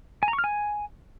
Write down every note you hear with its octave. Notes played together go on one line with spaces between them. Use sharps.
G#5
A#5
C#6
F6
G#5